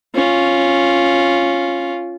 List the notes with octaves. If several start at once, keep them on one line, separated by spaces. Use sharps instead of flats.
C#4 F4